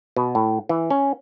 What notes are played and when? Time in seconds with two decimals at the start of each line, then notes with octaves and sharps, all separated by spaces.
0.16 B2
0.35 A2
0.69 E3
0.90 C#4